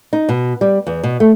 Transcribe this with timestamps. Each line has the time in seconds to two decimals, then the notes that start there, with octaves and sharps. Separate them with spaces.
0.13 D#4
0.29 B2
0.61 G3
0.87 E2
1.03 B2
1.20 A3